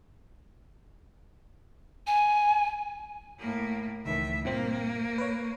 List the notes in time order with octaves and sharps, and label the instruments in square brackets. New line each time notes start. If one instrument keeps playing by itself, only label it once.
[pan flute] G#5
[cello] A2 A#3
[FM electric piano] C#2 D#3 E3 [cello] A2 E5
[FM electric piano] G2 A#2 C4 [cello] A#3
[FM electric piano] B4 C#5